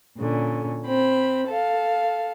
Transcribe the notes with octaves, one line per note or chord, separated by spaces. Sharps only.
A#2 D3 C#4
C4 B5
A4 F5